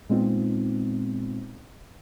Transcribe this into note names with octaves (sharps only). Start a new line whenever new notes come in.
A#2 G#3 B3 C4 D#4 F4